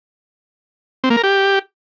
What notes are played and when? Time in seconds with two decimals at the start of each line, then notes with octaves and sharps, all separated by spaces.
1.04 C4
1.10 A#3
1.17 A#4
1.23 G4